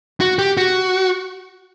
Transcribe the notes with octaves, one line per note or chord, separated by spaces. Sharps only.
F#4
G4
F#4